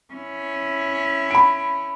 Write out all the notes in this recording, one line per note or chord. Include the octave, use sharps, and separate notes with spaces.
C#4 E4
B5 D7